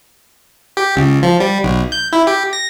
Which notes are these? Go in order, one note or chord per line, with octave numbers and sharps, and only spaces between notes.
G4
C#2
F3
G3
B1
G6
E4
G4
A#6